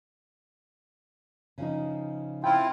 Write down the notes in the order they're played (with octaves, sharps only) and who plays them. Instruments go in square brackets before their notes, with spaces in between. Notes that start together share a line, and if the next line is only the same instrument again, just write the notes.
[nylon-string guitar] C#3 F3 D#4
[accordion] C4 E4 F4 [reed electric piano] G5